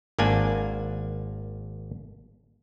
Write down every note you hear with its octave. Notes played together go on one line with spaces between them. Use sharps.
G#1 A#3 D4 G#5